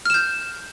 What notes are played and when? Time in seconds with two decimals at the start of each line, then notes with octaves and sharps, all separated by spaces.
0.05 F6
0.10 E7
0.14 G6